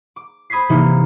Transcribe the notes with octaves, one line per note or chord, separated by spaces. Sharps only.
D6
C5 B5 D#6 G#6 B6 C7
C3 E3 F3 A#3 D#4